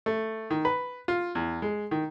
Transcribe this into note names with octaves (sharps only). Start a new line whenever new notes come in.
A3
D#3
B4
F4
E2
G#3
D#3